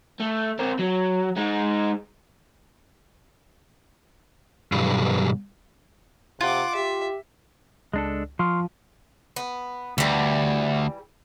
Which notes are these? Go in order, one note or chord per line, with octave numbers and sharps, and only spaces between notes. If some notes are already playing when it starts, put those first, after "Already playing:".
A3
C4 A#4
F#3
G#3 D#4
B1 G2
C3 F4 F#5 D6
G4 E5
C#2 G#3 D4 A4
F3 C6 C#6 F6
B3
D2 E3 G3